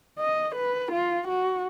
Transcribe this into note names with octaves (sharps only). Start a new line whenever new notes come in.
D#5
B4
F4
F#4